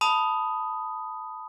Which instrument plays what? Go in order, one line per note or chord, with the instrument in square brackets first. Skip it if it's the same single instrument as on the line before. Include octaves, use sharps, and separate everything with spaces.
[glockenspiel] A5 B5 D#6